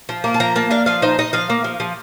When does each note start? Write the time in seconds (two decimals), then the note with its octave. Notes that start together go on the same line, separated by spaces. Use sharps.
0.09 F3
0.24 A#3
0.34 A5
0.40 F3 A#5
0.56 A#3 A5
0.71 D4 F5
0.86 F3 F5
1.02 D#4 C5
1.19 D#4 D#5
1.33 F3 F5
1.50 A#3
1.64 F3
1.80 F3